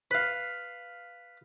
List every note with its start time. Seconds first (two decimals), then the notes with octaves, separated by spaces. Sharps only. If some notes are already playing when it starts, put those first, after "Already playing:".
0.11 B4 F5